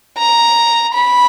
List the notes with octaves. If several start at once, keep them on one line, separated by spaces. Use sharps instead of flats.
A#5
B5